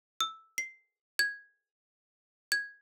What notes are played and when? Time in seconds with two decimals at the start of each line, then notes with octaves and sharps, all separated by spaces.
0.21 E6
0.58 C7
1.19 G#6
2.52 G#6